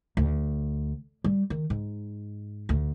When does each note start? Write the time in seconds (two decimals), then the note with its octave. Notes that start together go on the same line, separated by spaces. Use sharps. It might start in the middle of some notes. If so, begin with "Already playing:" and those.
0.17 D2
1.24 G3
1.50 D#3
1.70 G#2
2.69 D2